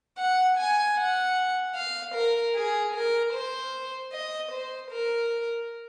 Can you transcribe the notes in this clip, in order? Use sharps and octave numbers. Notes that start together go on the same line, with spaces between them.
F#5
G#5
F#5
F5
A#4
G#4
A#4
C5
D#5
C5
A#4